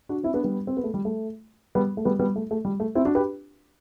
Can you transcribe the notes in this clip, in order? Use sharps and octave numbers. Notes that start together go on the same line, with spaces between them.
D4 F#4
C4 E4
B3 D4
G3 B3
C4
B3
A3
G3
A3
G3 B3
A3
G3 B3
G3 B3
A3
A3
G3
A3
C4 E4
D4 F#4
G4 B4